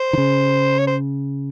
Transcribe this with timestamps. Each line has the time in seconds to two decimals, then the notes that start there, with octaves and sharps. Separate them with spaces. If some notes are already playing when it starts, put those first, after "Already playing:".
Already playing: C5
0.13 D#3
0.18 C#3
0.79 C#5
0.87 C5